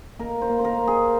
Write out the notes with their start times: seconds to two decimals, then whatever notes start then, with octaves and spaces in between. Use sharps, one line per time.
0.19 A#3 A#4
0.41 C5
0.49 A#3
0.59 C5
0.65 A#4
0.79 A#3
0.87 G#4